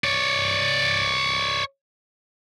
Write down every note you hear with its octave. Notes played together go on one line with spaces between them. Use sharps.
C#5 D5